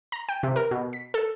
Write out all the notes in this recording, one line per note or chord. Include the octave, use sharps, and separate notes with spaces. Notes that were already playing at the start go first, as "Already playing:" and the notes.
A#5
G5
C3
A#4
B2
B6
A4